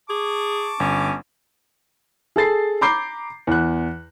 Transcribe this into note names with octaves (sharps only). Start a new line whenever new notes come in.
G#4 A5 C#6 D6
G1 C#4
G#4 A4 A6 C7
A#5 B5 D6 G6 C7
E2 F#6